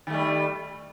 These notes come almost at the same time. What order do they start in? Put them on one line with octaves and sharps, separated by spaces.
D#3 A3 G3